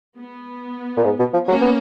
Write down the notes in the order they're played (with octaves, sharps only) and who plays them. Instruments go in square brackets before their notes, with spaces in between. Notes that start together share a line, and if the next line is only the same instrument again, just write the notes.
[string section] B3
[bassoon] A#2
G#2
B2
F3
[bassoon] F#3 [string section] A#3 C#4
[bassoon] B3